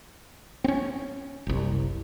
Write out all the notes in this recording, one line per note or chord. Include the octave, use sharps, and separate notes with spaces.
C4 C#4
F#1 C2